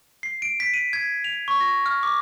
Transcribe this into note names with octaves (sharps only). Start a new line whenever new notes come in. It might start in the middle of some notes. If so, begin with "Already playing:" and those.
C7
D7
B6
D#7
G#6
F7
C#6
A#6
F6
D6